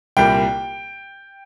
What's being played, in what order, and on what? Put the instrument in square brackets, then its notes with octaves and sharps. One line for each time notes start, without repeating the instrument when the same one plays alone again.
[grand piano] C2 A#2 G3 A#3 G5